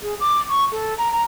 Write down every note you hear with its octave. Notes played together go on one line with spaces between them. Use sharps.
G#4
D6
C#6
A4
A#5
A#5